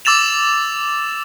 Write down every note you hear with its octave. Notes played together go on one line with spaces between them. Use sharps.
D6 E6 A6 E7 F7